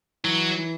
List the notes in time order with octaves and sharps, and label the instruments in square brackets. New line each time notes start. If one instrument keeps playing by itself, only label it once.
[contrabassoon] E3 [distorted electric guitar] F#3
[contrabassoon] E3